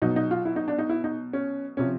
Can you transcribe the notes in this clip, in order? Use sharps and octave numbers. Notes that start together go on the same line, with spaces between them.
B2 F#3 D#4
D#4
F4
E4
D#4
D4
D#4
E4
D#4
C#4
C3 F3 C#4